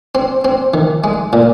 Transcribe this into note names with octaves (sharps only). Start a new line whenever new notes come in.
C4
C4
D#3
G#3
A#2